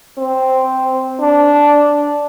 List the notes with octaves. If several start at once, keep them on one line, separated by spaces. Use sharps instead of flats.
C4
D4